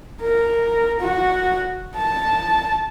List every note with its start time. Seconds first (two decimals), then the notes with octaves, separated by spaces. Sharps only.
0.22 A#4
1.00 F#4
1.96 A5